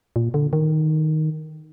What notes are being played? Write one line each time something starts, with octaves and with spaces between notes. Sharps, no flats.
A#2
D3
D#3